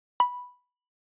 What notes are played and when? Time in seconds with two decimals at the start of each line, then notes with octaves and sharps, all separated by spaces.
0.20 B5